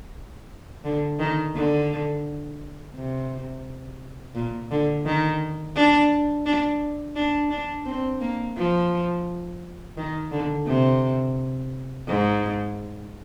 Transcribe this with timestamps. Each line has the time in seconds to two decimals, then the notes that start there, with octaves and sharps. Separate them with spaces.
0.84 D3
1.19 D#3
1.55 D3
2.95 C3
4.35 A#2
4.71 D3
5.06 D#3
5.76 D4
6.46 D4
7.15 D4
7.50 D4
7.86 C4
8.21 A#3
8.57 F3
9.97 D#3
10.31 D3
10.67 C3
12.07 G#2